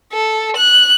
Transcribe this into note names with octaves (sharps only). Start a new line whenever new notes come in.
A4
F#6